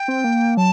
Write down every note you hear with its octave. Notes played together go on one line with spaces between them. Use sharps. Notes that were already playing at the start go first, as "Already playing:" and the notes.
Already playing: G5
C4
A#3
F#3 A5